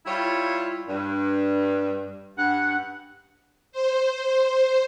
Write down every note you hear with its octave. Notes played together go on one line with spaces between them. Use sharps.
G3 E4 F4 C#5
G2
G2 F#5
C5